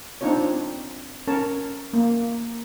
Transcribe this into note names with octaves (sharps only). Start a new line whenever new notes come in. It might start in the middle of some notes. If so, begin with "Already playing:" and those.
C4 D4 D#4 F4 C#5
C#4 A#4 C#5 A5
A#3